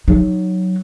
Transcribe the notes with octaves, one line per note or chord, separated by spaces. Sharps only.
F#3 D#4